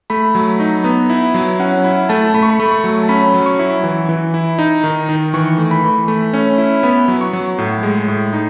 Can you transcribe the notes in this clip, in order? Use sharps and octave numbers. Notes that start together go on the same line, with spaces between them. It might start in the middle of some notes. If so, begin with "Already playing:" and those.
A3 B5
F#3
D#4
B3
E4
F#3
C#4 F#5
E4 B5
A3 A5
A3 B5
C#6
B5
A3
C#6
F#3
A5
C#4 B5
F#3
C#6
E4
E3
E3
E4
D#4
D#3
D#3
E3 C#6
A3
B5
E3
A3
C#4
E4
B3 B5
F#3
C#6
F#3
A2
G#3
A2
D#4